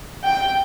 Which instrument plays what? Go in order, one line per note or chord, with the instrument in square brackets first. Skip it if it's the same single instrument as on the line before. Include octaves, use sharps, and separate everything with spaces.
[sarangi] G5